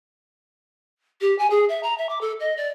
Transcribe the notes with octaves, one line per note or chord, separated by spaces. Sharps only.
G4
G#5
G#4
E5
A#5
E5
D6
A4
D#5
D5